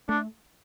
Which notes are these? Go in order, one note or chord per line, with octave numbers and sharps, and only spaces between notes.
A3 D4